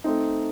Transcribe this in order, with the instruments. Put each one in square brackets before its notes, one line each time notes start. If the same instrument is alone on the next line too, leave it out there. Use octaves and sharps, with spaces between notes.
[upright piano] A3 C4 D#4